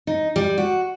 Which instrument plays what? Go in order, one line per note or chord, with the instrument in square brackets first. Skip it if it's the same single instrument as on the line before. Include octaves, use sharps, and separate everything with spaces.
[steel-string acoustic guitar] D#4
G3
F#4